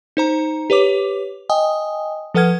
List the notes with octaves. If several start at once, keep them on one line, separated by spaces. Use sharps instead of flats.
D#4 C5 A#5
G4 B4 C#5 D6
D#5 G5 G#5 D#6
F3 A4 B4 F#5 F6 G#6